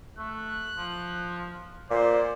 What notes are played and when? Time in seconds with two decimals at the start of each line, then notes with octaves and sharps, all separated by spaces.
0.18 A3 F#6
0.76 F3
1.90 A#2 C5 D5